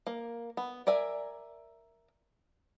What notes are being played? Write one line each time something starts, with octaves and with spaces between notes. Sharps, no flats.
A#3
B3
A#4 D5 E5 G#5